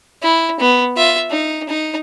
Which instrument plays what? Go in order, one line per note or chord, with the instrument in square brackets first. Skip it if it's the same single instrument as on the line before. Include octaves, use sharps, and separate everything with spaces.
[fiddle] E4
B3
F4 E5
D#4
D#4